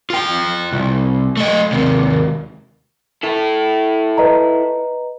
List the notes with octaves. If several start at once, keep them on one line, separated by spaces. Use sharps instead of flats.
F4 G5
C2
A3 D#5
D#2 C3
E4 A4
B4 D#5 A#5